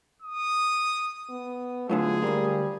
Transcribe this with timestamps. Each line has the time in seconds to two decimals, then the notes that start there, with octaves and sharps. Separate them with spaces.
0.22 D#6
1.30 B3
1.89 F#2 A2 D3 F4 G#4
2.22 D2 G3 A#3